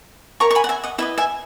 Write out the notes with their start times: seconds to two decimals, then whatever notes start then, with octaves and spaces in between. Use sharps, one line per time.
0.40 E4 A#4 C#5 A#5 C#6
0.51 C#6
0.55 G#5 B5
0.64 F#5
0.69 E5 G#5
0.84 D#5 F#5
0.98 E4 B4 D#5 E5
1.18 E5 G#5